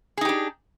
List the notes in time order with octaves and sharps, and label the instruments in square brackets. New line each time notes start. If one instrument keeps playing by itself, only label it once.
[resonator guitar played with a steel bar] G#4
D#4
G4
D4